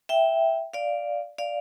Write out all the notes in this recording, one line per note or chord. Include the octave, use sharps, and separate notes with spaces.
E5 G5
D5 F5
D5 F5